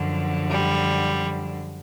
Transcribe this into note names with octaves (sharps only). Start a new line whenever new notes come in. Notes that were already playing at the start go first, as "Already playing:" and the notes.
Already playing: F#2 D3 F3
G3